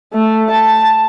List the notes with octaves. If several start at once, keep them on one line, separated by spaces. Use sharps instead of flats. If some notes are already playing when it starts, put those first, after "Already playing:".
A3
A5